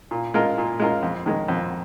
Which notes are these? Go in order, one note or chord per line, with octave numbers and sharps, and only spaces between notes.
A#2
G#3 F4 A#4
A#2
G#3 F4 A#4
F2
D#3 G#3
F2